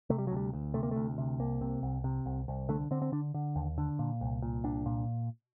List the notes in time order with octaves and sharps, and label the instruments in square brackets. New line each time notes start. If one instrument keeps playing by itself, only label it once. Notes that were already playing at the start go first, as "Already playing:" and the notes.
[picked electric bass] C3 A3
G3
F#3
D2 G3
D2
C3 A3
A#3
D2 A3
C3
C2 A#3
C3
C2
C3
C2
C2
D3 A3
D3 C4
C4
D3 D4
D3
D#2
D3
A#2
C2
A#2
C2 D4
A#2